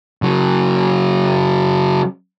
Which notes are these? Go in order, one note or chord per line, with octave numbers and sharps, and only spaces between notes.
C#3 F#3